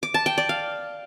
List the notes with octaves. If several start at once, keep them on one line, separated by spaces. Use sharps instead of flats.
D6
A5
G5
D5
F5